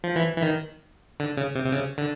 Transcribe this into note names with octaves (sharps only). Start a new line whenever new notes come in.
F3
E3
E3
D#3
D3
C#3
C3
C3
C#3
D3